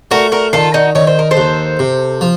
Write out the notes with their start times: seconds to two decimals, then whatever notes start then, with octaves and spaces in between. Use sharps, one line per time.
0.11 A3 F#4 A#4
0.32 F#4 A#4
0.53 D#3 F4 A4
0.74 D#4 F#4
0.95 D#3 C#5
1.07 C5
1.19 A#4
1.31 A4 C5
1.37 D#2
1.79 C3
2.21 F3